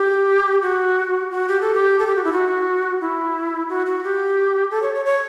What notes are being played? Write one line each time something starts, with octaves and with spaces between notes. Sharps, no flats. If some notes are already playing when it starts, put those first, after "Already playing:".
Already playing: G4
F#4
F#4
G4
A4
G4
A4
G4
F#4
E4
F#4
E4
F#4
F#4
G4
A4
C#5
C#5
C#5